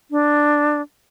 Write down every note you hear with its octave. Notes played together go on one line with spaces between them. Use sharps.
D4